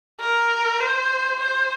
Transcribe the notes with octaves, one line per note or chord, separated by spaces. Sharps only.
A#4
C5
C5